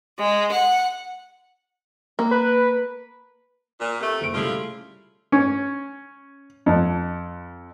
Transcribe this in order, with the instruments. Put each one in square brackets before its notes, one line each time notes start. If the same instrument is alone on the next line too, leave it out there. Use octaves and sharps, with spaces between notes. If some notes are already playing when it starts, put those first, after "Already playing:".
[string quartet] G#3
F#5
[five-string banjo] A#3
[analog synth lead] B4
[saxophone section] A#2
C3 A3
[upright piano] F#1 D7
[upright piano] C#3 G3 A3 [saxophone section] F3 E4 F4
[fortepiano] C#4
F2